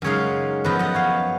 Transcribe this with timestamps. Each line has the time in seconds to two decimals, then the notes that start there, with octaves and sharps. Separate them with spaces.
0.02 F#2 C#3 G#3 D#4 C#5 F5
0.64 F#2 F3 B3 B4 D#5
0.79 D#5 F#5
0.94 C#5 F5